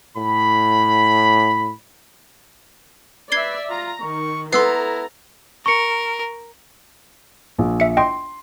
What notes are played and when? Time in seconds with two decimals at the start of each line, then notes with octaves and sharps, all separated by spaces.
0.18 A2 B5
3.32 B4 D5 E5 G#6 C7 G7
3.70 F4 A#5
4.01 D#3 C#6
4.53 B3 E4 A4 A#5 C6 E6 C7
5.66 A#4 C#6 C#7
7.58 A#1
7.80 E5 C#7
7.97 D#5 G5 C6